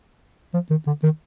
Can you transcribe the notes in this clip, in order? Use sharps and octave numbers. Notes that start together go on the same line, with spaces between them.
F3
D#3
D3
D#3